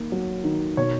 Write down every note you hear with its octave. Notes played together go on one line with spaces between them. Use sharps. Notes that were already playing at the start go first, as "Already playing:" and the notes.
Already playing: D#3 A#3
F#3
D#3
B2 C#5